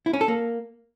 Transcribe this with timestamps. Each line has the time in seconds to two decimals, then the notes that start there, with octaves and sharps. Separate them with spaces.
0.06 E4
0.13 C#4
0.21 A4
0.28 A#3